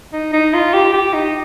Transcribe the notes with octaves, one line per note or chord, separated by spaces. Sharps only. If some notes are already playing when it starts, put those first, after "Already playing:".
D#4
D#4
F4
G4
G4
D#4